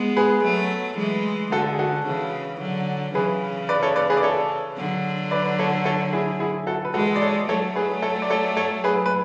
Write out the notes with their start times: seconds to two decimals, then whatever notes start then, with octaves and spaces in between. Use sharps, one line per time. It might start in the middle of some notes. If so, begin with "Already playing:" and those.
Already playing: G#3 B3
0.17 G#4 B4
0.44 F#3 A3
0.98 E3 G#3
1.52 D3 F#4 A4
1.73 G#4
1.79 F#4 A4
2.06 C#3 E3
2.61 D3 F#3
3.14 C#3 E3 G#4 B4
3.69 B4 D5
3.83 A4 C#5
3.96 B4 D5
4.10 G#4 B4
4.17 D5
4.23 A4 C#5
4.77 D3 F#3
5.31 B4 D5
5.59 A4 C#5
5.85 A4 C#5
6.13 E4 G#4
6.40 E4 G#4
6.67 F#4 A4
6.85 B4
6.94 E3 G#3 F#4 A4
7.16 D5
7.22 A4 C#5
7.48 F#3 A3 A4 C#5
7.76 G#4 B4
8.02 A4 C#5
8.22 D5
8.30 A4 C#5
8.57 A4 C#5
8.84 G#4 B4
9.06 B4